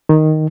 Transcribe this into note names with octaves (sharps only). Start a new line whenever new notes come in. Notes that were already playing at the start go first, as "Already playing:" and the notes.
D#3